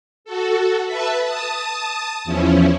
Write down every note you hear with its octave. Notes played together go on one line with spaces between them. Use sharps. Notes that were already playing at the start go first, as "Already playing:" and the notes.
F#4 A4
B4 E5 A5
A5 D#6
E2 F3 C#4 E4